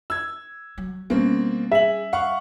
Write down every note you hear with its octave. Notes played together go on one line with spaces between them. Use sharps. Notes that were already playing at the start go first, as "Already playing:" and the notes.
E6 G#6
F#3
B2 G3 A#3 C4 C#4
G#4 E5 F#7
F5 F#5 C#6